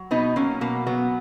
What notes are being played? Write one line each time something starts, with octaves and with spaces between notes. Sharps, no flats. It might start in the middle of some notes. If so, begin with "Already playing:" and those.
Already playing: F#3
B2 B3 D#4
F#3 A#3 C#4
B2 A#3
F#3 B3